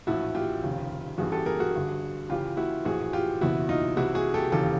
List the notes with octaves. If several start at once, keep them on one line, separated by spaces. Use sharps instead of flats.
A#1 A2 E3 E4 F#4
F4 G4
F1 D#2 C#3
A1 G2 E3 F#4 G#4
G4 A4
G#4 A#4
F#4 G#4
G1 G2 D3
C#2 C#3 E3 F4 G4
E4 F#4
A#1 A2 E3 F#4 G#4
F4 G4
F#1 E2 B2 E4 F#4
D#4 F4
C2 C3 E3 E4 F#4
F#4 G#4
G4 A4
E1 D#2 C#3 E3 G4 A4